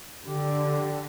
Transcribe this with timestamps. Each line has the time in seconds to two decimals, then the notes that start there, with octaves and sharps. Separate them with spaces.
0.23 D3 G4